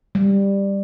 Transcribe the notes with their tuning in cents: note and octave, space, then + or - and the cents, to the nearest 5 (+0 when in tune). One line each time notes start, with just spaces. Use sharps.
G3 +10